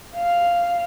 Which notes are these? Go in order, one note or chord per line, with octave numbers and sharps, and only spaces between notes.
F5